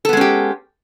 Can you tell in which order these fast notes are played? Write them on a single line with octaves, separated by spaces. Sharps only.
A4 B3 G#3 C#4 G4